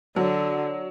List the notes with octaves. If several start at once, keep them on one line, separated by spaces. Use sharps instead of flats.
D3 F#3